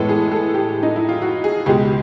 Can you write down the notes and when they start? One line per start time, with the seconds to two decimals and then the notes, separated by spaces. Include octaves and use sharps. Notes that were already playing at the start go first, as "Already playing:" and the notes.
Already playing: A2 E3 G#3 B3 A4
0.09 G#4
0.32 A4
0.54 G4
0.83 D#4
0.96 E4
1.09 F4
1.22 F#4
1.44 G#4
1.66 C#2 B2 G#3 G4